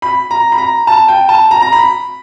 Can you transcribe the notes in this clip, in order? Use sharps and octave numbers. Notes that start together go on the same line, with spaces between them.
B5
A#5
B5
A#5
A5
G5
A5
A#5
A#5
B5